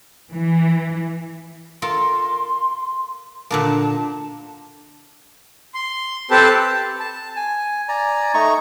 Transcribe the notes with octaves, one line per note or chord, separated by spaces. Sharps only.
E3
F4 A4 A#4 C6
A#2 D3 A#3 A5
C6
C4 G4 A4 B4 C5 A5
A5
G#5
D5 G#5 A#5
A3 D#4 A#5 C#6